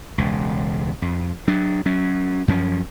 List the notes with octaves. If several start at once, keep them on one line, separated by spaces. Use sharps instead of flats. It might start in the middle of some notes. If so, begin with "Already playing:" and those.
E1 C#2
F2
F#3 D4
F#3 C#4
F#2 F3 C#4